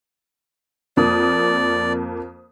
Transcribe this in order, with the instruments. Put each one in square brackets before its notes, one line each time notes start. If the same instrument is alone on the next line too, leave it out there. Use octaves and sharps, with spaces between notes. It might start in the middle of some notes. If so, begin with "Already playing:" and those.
[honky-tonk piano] F2 A#3 D#6 [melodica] D5